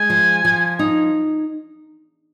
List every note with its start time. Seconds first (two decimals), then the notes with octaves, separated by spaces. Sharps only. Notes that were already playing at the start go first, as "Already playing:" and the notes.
Already playing: G#3 G#5
0.10 F3
0.45 F3
0.79 D#4